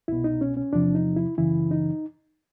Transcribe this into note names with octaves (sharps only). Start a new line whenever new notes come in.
C2 B2 E4
D#4
C#4
C#4
E2 C3 F3 D4
D#4
E4
F#2 C#3 E3 E4
D#4